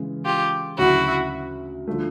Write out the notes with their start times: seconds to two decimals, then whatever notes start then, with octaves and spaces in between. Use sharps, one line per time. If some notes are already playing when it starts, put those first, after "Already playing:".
Already playing: C#3 E3 G#3
0.24 F4 G4
0.78 D2 C#3 F#3 E4 F#4
1.87 D3 F3 A3